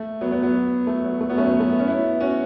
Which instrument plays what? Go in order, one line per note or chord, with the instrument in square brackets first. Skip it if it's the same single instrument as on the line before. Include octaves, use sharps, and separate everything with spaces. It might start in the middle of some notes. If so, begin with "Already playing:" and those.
Already playing: [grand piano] A3
F#3 B3
F#3 B3
F#3 B3
A3
F#3
A3
F#3 B3
A3 C#4
F#3 B3
A3
B3
C#4
B3 E4
C#4 F#4